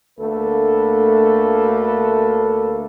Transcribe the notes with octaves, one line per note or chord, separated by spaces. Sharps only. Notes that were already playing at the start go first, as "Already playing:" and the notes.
D2 A3 A#3 A4 B4